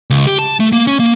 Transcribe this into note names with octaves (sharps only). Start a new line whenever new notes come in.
C#2
G4
A5
A3
A#3
C#4
A#3